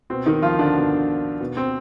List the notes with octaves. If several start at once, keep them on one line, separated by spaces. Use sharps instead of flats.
B2 C4
D#3 D#4
F3 F4
D3 D4
B2
B2
C4